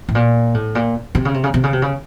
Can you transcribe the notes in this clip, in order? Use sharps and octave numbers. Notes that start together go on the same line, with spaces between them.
A2
A#2
A2
A#2
C3
C#3
C3
C#3
C3
C#3
C3
C#3